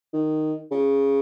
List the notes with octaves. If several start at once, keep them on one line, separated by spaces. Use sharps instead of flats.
D#3
C#3